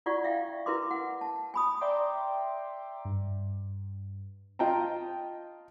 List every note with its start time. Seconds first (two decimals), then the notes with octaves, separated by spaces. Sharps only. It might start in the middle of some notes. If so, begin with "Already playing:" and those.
0.06 E4 F4 D5 F#5 C#6
0.24 E5 F5 G5
0.66 E4 A#4 B4 C6 D6
0.91 F#5
1.21 A5
1.54 G#5 B5 D#6
1.81 D5 E5 G5 A#5 C6 D6
3.05 G2
4.59 F4 D#5 G5 A5 A#5